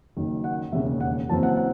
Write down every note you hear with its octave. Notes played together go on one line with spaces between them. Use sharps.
F#1 F#2 D#3
F#5
E1 D#2 C#3 E5
F#5
F#1 F#2 E3 C4 A5
F#5
F#5